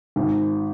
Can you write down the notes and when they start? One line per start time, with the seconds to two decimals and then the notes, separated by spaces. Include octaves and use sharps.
0.16 G#1